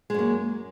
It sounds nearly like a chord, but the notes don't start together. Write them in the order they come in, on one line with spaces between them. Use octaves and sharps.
G#3 F#2 A#3